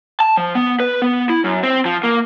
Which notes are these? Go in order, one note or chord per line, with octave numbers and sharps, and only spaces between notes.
A5
F3
B3
B4
B3
E4
F#2
C4
F3
A#3